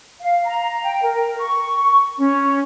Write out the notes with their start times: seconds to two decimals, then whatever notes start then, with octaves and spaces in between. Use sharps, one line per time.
0.20 F5
0.44 A#5
0.82 G5
1.02 A#4
1.37 C#6
2.17 C#4